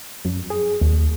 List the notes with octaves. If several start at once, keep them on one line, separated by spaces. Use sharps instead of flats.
F#2
G#4
D#2